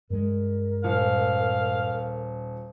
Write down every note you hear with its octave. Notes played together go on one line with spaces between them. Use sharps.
G2 G#3 A#4
D#1 F5